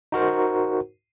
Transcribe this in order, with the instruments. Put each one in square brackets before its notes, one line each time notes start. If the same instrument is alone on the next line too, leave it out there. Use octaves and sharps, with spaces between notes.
[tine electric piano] D#4 F#4 A#4 C5